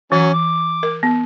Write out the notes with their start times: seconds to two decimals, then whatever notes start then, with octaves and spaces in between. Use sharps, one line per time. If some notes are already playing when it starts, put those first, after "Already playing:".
0.12 E3 F#3 C#4
0.33 D6
0.83 A#4
1.03 B3